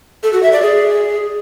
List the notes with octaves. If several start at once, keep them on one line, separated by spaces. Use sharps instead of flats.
A4
F#4
E5
D5
G#4